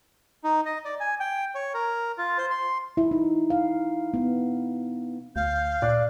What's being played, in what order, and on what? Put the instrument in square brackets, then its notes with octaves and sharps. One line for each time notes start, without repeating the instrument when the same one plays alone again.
[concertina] D#4
D#5
D5
G#5
G5
C#5
A#4
F4
C5
C6
[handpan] E4
D#4
F5
B3
[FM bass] D2 [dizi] F5 [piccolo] G6
[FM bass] A#2 [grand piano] D5 [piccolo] F#6